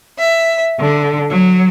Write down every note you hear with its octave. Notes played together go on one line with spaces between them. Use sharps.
E5
D3
F#3